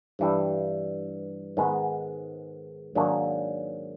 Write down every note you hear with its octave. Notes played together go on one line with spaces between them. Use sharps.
G2 E3 G3
G#2 D#3 G#3 B3
G#2 D#3 F#3 A#3 D4